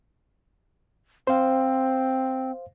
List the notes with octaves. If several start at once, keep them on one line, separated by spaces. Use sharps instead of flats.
C4 C5 F5